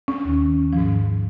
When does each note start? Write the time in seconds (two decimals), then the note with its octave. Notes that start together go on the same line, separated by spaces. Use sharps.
0.08 C#4
0.24 D#2 D#3
0.73 G#2 F3